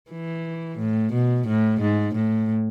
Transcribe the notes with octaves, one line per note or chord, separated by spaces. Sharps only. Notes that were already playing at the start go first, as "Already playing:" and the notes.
E3
A2
B2
A2
G#2
A2